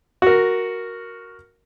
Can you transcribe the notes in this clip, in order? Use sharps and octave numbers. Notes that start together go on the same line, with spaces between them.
F#4 A#4